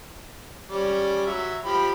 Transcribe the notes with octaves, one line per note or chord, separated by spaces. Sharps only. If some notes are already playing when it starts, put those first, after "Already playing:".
G3 C#4 D5
F#3 E5
F3 G4 B5